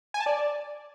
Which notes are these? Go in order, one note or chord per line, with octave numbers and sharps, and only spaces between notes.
G#5
A5
D5